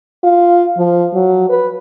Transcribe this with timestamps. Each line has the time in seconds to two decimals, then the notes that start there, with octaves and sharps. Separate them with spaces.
0.23 F4
0.78 F3
1.14 F#3
1.49 B4